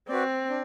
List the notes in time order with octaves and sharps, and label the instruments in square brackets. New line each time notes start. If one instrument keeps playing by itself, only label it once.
[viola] C4 [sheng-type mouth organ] F#4 B4 D5
[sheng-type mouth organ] D4